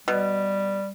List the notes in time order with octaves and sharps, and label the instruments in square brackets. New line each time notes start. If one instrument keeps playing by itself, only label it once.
[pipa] B2 [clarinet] G3